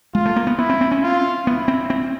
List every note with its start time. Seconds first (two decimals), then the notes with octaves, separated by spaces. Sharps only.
0.14 G#3 F4
0.26 A3
0.36 A#3
0.47 B3
0.58 B3 E4
0.69 C4
0.81 C4
0.91 C#4
1.03 F4
1.47 B3 E4
1.68 C4
1.90 C4